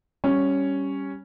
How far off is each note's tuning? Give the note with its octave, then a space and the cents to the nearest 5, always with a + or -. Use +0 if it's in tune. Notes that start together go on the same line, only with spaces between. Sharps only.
G3 +0 C#4 +0